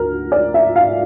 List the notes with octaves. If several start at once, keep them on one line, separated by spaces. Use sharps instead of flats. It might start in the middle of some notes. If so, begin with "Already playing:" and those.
Already playing: D2 A#4
D5
E5
F5